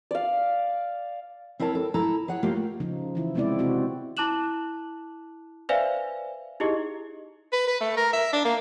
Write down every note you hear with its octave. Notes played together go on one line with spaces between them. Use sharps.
D5 F5
C4 E4 A#4 C#5 A5
A4
E4 A4 A5 A#5
G#4 C#5 F#5
A3 A#3 F4 G4
C#3 F3 D#4
E3 E4
C3 G#3 B3 C4 E4 D5
C3 C4 F#4
E4 A5 D6 F#6 E7 F#7
B4 C5 D5 E5 F5 G#5
D#4 E4 G4 G#4 D#5
B4
B4
A3
A#4
E5
D4
A#3